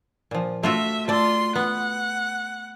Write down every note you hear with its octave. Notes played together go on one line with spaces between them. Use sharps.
A#2 F3
A3 F4 F#4 E5
A3 F4 D5 A5 C6
B3 F#5